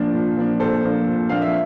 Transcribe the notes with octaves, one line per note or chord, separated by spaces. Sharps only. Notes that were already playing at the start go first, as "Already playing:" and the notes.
Already playing: A#2 F3 A#3 D4 C5
A#2
F3 A#3 D4
A#2 A4 C5
F3 A#3 D4
A#2
F3 A#3 D4 F5
E5